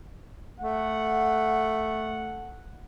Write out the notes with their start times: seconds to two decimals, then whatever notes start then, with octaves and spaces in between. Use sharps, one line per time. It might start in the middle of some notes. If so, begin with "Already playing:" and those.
0.60 A3 F#5